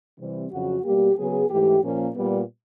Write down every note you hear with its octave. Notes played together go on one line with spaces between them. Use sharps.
C3 E3 G3 C4
F2 C#3 F#3 F#4
B2 G3 A#3 G4
C#3 F#3 B3 G#4
G#2 E3 A3 G4
A#2 F3 A#3 C#4
A#2 G3 B3